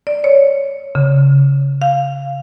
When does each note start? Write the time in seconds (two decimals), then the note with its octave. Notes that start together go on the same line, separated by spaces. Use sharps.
0.07 D5
0.24 C#5
0.95 C#3
1.82 F5